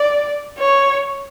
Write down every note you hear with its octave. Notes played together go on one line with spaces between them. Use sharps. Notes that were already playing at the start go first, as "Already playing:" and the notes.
Already playing: D5
C#5